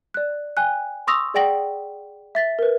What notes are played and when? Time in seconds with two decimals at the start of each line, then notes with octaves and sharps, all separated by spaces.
0.14 D5 F#6
0.57 G5 G#5 F#6
1.07 C6 C#6 D#6 E6 A#6 F7
1.34 G#4 D5 F#5 G5 A#6 F#7
2.35 E5 A6 B6
2.59 A#4 B4